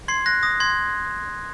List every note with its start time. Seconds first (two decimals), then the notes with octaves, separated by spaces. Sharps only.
0.08 C6 G#6 C7
0.26 F#6 A#6
0.43 D#6 A#6
0.60 C6 G#6